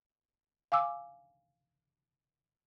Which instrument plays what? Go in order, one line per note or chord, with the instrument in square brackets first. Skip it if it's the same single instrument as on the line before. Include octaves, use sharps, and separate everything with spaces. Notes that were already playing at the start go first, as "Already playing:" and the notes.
[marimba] F5 G#5 D6 E6